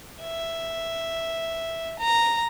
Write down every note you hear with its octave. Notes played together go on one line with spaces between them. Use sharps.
E5
A#5